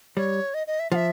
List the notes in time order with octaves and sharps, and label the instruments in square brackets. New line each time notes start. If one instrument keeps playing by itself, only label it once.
[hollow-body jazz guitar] G3 [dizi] C#5
[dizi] D#5
D#5
E5
[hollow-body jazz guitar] F3 [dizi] F#5
[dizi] E5